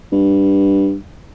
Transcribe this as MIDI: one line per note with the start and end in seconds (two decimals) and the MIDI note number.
0.13 0.96 43